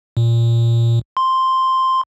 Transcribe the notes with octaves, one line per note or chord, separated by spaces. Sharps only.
A#2
C6